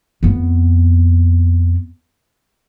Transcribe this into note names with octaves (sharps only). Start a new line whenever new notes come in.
F2 B3